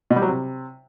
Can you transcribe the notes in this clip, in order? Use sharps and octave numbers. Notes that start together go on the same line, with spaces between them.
B2
G3
F#3
C3